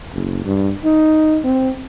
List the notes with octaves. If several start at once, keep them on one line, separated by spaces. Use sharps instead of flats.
F#1
G2
D#4
C4